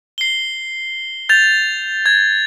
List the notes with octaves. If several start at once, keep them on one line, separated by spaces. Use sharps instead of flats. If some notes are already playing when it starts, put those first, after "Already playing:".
C7 G7
G6 A6 F7
G#6